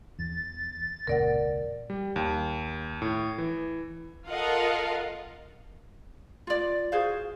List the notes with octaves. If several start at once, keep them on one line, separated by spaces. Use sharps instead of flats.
E2 A6
E1 C#2 A#2 A#4 D5 F#5
G3
D#2
A2
E3
F4 A4 A#4 D#5 F5 F#5
F4 D5
F#4 G#4 C5 F5